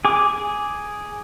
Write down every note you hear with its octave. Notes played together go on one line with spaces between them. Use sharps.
G#4 D6